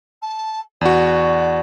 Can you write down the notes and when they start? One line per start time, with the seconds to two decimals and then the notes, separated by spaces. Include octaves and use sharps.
0.22 A5
0.81 E2 F#4 D5